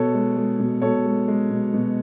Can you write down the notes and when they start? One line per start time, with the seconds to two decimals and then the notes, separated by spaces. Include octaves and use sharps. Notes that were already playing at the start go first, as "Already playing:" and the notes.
Already playing: B2 A4 C#5
0.14 G#3
0.36 G#3
0.59 B2
0.82 B2 A4 C#5
1.05 G#3
1.28 G#3
1.51 B2
1.74 B2